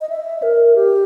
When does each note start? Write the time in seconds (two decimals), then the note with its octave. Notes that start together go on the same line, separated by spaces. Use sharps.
0.01 D#5
0.09 E5
0.43 A#4
0.76 G4